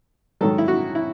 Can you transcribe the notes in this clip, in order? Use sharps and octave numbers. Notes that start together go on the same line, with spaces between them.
G#2 D#3 F#3 A4
E4
F#4
E4